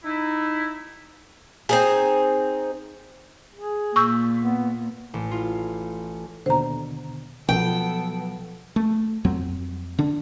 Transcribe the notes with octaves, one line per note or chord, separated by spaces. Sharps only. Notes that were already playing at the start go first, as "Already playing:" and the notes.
D#4 E4
C4 D#4 G#4
G#4
A#2 C#6 E6 G6
B3
A1
F4
D#2 B2 D3 C5 A#5
B2 F3 F#3 B3 A4 G5
A3
F2 F#3 C4
D3 D4